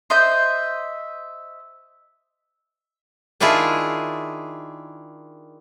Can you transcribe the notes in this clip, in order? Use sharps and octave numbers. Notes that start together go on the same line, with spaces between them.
C5 D#5 E5 G6
D#3 D4 E4 F4 G#4